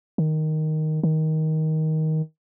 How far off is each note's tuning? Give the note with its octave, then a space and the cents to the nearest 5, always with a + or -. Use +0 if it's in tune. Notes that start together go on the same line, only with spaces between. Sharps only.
D#3 +0
D#3 +15